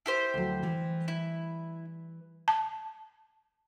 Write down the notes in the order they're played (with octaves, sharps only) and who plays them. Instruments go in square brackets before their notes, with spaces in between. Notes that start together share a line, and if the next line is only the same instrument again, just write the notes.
[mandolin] E4 G4 C5
[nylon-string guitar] D2 F#3
E3 G3
[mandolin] E4
[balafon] A5